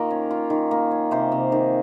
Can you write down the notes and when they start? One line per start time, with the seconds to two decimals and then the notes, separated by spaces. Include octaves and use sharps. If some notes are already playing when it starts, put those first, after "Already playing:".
Already playing: D#3 A#3 F4 A#5
0.11 C#4
0.31 F4
0.50 D#3
0.71 A#3
0.91 C#4
1.11 C3 C5
1.32 C3
1.52 D#3